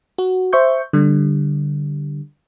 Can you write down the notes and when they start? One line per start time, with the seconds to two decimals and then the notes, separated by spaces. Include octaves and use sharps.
0.18 F#4
0.53 C5 E5 C#6 G6
0.93 D3 G3